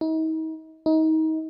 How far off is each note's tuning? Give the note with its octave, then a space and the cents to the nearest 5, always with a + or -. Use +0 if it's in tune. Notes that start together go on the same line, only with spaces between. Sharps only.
D#4 +40
D#4 +30